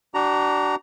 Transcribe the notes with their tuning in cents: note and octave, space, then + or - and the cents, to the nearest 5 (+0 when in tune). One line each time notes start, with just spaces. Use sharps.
D4 +0 F#4 +40 A#5 +0